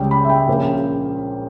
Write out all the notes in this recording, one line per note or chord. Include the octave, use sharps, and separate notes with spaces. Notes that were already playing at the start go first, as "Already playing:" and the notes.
Already playing: C#2 C#3 G3 C#4 G5
B5
E5
G5
A#1 A#2 A#3 C#4